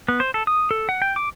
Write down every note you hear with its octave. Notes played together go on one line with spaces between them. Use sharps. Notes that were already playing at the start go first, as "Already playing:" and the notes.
B3
C5
A4
D#6
A4
F#5
G5
D6